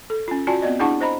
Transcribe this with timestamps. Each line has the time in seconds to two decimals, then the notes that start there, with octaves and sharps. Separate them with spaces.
0.10 A4
0.28 C#4 F4
0.47 F4 F#4 D5 G#5 A5
0.62 B3 C4 D5 D#5
0.80 D4 E4 G#4 F#5 A5 C#6
1.01 C5 D#5 A#5 B5